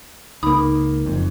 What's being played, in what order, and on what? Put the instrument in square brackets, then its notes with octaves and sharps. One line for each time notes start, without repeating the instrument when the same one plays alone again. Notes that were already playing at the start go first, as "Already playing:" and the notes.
[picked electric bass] C#2 A#3 [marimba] D#4 B5
[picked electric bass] F#1 F2